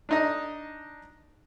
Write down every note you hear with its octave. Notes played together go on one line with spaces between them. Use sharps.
D4 D#4 D#5